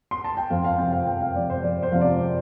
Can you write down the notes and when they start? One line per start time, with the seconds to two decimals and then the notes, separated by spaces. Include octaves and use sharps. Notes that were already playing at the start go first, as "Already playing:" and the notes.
0.11 C6
0.24 A5
0.37 G5
0.50 F2 F5
0.65 F5
0.78 C3 G5
0.81 F3
0.93 F5
1.07 F2 G5
1.21 F5
1.35 C3 F3 D5
1.50 C5
1.63 F2 D5
1.82 C5
1.92 C3 F3 F5
2.01 D5